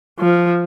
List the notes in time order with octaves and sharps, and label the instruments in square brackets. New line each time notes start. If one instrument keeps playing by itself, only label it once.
[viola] F3